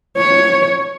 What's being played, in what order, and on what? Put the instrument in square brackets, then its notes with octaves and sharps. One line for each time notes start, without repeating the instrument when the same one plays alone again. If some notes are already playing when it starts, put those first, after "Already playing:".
[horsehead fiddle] C#5